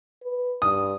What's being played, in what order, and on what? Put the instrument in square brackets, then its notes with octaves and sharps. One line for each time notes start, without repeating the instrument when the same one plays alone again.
[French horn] B4
[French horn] G2 [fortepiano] D#6